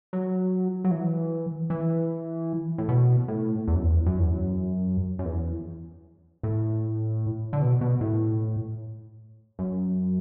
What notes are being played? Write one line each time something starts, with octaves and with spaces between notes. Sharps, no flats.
F#3
F#3
E3
E3
A2
B2
A2
E2
F#2
E2
F#2
E2
F#2
F#2
E2
A2
D3
B2
B2
A2
F#2